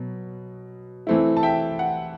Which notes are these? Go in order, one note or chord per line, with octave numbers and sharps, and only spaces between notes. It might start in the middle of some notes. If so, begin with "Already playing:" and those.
Already playing: B2 F#3 B3
E3 A3 C4 E4
A5
E5 G5
F#5